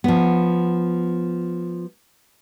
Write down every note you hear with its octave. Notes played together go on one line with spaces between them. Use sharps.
F3 B3